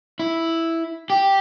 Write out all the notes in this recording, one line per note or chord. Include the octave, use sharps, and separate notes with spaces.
E4
G4